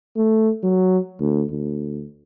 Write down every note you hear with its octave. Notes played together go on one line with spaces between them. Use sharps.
A3
F#3
D2
D2